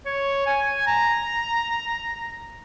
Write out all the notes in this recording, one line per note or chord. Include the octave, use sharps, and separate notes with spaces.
C#5
G#5
A#5